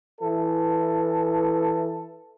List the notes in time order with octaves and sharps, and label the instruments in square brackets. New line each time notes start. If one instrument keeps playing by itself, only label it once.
[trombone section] E3 A4